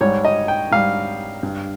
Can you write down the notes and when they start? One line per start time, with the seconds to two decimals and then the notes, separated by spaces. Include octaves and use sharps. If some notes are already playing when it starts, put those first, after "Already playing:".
0.01 G#2 G3 C#5
0.25 D#5
0.48 G5
0.71 G#2 G3 F5
1.43 G2 G3